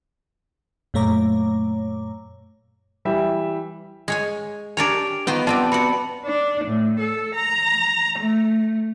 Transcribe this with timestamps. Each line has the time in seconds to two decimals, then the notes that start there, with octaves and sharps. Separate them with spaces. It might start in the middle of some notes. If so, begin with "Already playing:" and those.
0.94 F#2 A#2 A3 C#5 A#5 D6
3.05 E3 G3 E5
4.08 G#3 C#5 G#5
4.77 D4 G4 A#4 C#5 G#5 D7 F7
5.27 D#3 B3 F4 B4 C5 D#5 G5
5.47 G3 C4 F4 D5 A5
5.72 C4 F#4 B5 C#7
6.24 D4
6.63 A2
6.98 A4
7.34 A#5
8.18 A3